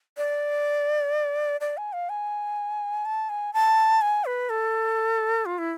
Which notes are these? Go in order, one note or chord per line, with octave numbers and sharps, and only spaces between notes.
D5
D5
G#5
F5
G#5
A5
G#5
A5
G#5
B4
A4
F4
E4